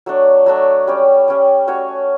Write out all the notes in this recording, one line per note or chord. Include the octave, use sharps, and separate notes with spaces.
F#3 A3 D4
F#3 A3 D4
G3 C#4 G4
G3 C#4 G4
A3 C#4 F#4 C#5